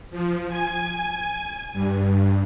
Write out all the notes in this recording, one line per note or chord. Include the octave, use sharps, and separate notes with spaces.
F3
G#5
G2